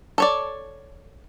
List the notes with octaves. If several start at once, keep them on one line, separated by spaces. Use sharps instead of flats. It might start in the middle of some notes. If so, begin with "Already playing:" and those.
A4 C#5 D5